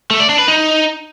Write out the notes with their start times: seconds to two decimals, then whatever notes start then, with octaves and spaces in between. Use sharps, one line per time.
0.11 A3
0.20 D5
0.29 D4
0.39 B4
0.48 D#4